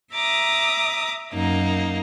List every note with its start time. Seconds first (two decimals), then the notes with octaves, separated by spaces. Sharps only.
0.13 E5 A#5 D6 D#6
1.32 F#2 A#3 D#4